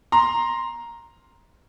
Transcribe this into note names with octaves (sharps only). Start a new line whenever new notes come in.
A#5 C6